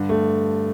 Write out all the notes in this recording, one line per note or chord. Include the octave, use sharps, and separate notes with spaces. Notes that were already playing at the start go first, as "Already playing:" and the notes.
Already playing: G2 D3
A3